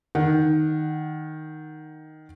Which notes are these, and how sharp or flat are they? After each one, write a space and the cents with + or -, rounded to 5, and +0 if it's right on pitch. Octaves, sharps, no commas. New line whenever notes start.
D#3 +0 F#5 +0